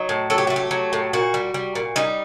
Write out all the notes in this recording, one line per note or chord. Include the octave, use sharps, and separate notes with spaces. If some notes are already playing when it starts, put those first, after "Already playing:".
Already playing: F#3 D#4
A2
F#3 A4
G4
A3 F#4
G4
F#3
A2
A#2 F#4
G3
G3
A#2
G3 D#4